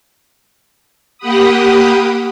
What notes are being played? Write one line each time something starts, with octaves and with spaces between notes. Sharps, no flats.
A#3 G4 F#5 B5 D#6